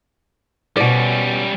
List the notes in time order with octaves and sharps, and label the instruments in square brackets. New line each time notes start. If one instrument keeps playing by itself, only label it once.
[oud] B2 D5 [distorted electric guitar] G3 C#4